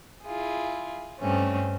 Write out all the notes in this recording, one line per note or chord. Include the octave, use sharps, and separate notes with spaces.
E4 F4 G#4
G2 A3 C4 C#4